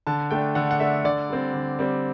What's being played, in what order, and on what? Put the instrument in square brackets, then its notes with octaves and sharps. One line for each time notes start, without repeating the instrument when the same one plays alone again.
[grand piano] D3 A5
A3 D4 G5
D3 F#5
F#5
A3 D4 E5
D3 D5
G3 C4
D3
G3 C4